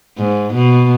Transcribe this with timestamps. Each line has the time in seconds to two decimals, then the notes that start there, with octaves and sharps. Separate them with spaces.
0.18 G#2
0.54 B2